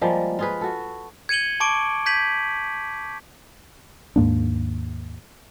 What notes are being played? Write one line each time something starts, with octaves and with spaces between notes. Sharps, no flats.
F3 G3 G#3 A#3
F4 G#4 B4
F#4 A4
G#6 C#7 D#7 F#7 G7
A5 C#6 D6 D7
G6 G#6 B6 D#7 F#7
D#2 G#2 A#3 D4